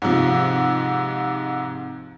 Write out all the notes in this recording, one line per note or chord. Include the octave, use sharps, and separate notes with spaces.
G#2 C3 F3